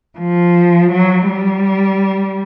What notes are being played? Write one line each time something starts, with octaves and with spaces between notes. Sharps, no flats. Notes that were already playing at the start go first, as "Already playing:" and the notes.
F3
F#3
G3